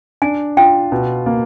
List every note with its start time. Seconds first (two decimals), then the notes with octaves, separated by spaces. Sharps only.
0.22 D4 G#5
0.57 F4 G5
0.92 B2
1.26 A#3